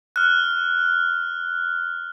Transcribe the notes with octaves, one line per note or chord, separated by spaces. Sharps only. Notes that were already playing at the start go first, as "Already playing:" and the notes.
F6 F#6